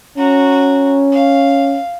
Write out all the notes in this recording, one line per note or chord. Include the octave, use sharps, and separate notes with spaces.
C#4 F#4 A#5
F5